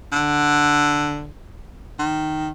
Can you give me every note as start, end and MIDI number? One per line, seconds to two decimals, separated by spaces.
0.12 1.28 50
1.99 2.50 51